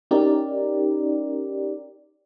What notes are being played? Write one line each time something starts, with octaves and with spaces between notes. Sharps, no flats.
C#4 D#4 G4 A#4 D5